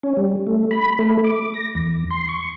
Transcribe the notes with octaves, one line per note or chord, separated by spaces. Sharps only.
C#4
G3
A3
B5
A3
D6
A#6
E2
C6
C#6